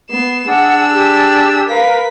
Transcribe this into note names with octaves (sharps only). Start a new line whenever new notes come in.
B3 C7 E7
D4 G#4 F#5 E6
G4
A#4 B4 F5 B6